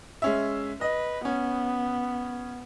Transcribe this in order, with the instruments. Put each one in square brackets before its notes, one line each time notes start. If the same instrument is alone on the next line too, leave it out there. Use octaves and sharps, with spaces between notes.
[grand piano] G#3 C#4 E5
[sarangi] B4 [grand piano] D#5
[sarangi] B3 [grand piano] C#4